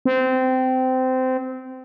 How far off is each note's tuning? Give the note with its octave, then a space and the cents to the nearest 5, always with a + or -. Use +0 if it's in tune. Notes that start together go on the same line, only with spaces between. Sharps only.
C4 -20